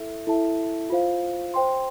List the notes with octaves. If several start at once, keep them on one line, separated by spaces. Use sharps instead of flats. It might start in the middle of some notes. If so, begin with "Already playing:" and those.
Already playing: E4 A4 E5
E4 A4 E5 A5
F4 C5 F5
C5 G5 C6